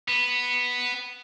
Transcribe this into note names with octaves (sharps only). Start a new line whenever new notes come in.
B3